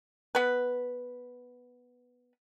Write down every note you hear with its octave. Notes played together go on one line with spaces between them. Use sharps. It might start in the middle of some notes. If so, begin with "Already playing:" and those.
B3 B4